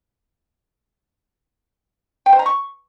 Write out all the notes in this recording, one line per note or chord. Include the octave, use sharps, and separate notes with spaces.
G5
C5
A#5
C#6